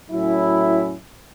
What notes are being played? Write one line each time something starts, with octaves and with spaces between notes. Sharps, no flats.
A2 F#3 C#4 E4